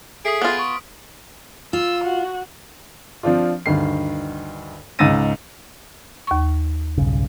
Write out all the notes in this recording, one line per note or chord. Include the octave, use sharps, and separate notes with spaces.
G#4 A4 E5 D#6 B6 C7 D7
B3 F4
C#6
F4 E6
F#4
F3 C4 D4 F4
D2 G2 D#3 C7
C#2 G#2 E6 A6 A#6 D#7
D#2 C#6
B1 G2 C#3